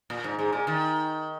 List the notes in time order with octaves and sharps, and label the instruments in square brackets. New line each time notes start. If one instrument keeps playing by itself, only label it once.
[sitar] A#2
G#2
G#2
A#2
D#3